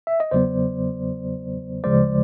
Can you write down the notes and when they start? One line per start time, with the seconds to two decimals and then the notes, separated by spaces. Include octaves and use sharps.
0.07 E5
0.20 D#5
0.31 E2 C#3 F#3 B3 C5 D5
1.84 D2 C#3 F3 G#3 C5 D5